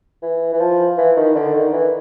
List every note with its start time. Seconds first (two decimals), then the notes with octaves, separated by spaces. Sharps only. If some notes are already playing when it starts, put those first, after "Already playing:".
0.23 E3
0.54 E3
0.60 F3
0.98 E3
1.17 D#3
1.35 D3
1.54 D#3
1.73 E3